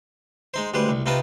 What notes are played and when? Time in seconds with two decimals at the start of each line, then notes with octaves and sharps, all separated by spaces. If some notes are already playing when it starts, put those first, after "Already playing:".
0.54 G#3 D#4 C5
0.74 D2 G3 G#3 B4 C5
0.89 C2
1.06 C3 C4 D#4 F4 B4 A5